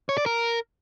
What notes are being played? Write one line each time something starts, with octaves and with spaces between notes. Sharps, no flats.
C#5
D5
A#4